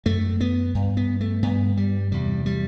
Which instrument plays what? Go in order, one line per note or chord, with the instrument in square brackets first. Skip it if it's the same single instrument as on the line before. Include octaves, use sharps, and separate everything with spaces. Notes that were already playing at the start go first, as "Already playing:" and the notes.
[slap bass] F#2 A3
B3
G2
B3
A3
G2 B3
G3
E2 C3 G3
G3